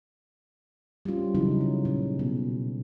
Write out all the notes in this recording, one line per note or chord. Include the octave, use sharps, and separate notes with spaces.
G3 C4 C#4 F4
C#3 E3 F#3 D#4 E4
C#3
A#2 C#4
B2